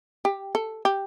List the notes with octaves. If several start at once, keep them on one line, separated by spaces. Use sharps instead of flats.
G4
A4
G4